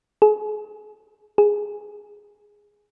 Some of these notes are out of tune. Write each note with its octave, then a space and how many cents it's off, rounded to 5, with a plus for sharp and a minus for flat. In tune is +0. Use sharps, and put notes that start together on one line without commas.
G#4 +35
G#4 -5